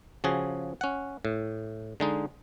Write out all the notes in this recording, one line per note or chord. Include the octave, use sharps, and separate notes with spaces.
C#3 F3 F#4 G#4
C#4 F#5
A2
D3 G#3 D#4